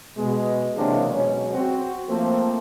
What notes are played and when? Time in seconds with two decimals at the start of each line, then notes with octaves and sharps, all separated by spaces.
0.17 B2 G#3
0.76 C3 E3 F#3 G#3 A#3 D4
1.09 B2 F#3 G#3 C#4
1.53 C4 F#4
2.08 F3 A3 A#3 C4